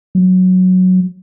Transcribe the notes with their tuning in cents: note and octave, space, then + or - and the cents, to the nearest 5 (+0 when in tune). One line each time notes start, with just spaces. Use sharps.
F#3 -5